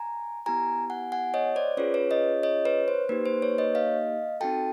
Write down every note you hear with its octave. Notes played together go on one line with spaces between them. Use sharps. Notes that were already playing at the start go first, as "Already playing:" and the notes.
Already playing: G#5 A#5
B3 E4 G4 G#5 A#5
F#5 G#5
F#5 G#5
C#5 D#5
C5 D5
C#4 F4 G#4 B4 C#5
B4 C#5
C#5 D#5
C#5 D#5
B4 C#5
C5
A#3 D#4 G4 B4
C5
B4 C#5
C#5 D#5
D#5 F5
C4 D#4 F#4 A4 G5 A5